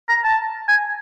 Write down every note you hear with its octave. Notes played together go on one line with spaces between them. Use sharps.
A#5
A5
G#5